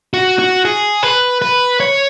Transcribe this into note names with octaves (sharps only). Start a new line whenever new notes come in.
F#4
F#4
G#4
B4
B4
C#5